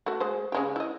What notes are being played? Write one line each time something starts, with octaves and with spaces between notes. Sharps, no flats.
A3 F#4
G#3 C5
C#3 G#3 G4
E4 D#5